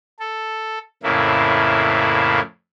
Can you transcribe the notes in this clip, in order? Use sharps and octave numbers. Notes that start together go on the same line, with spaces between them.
A4
F2 A2 C#3 A#3 E4